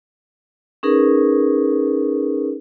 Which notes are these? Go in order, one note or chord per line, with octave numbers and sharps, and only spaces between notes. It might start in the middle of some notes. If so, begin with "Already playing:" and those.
C#4 D#4 G#4 A#4 B4